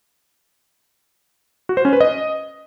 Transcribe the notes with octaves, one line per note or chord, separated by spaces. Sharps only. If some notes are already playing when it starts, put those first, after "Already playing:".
F#4
C5
C#4
B4
D#5